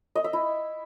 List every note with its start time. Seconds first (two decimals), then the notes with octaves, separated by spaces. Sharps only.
0.15 D#5
0.24 E5
0.33 E4